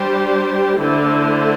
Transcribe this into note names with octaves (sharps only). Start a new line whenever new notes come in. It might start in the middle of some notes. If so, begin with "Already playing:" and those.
Already playing: G3 D4 G4 C5
D3 A3 E4 C5